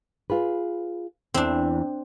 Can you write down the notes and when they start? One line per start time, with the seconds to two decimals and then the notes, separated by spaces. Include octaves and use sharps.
0.30 F4 G#4 B4
1.34 E2 E3 C4 D4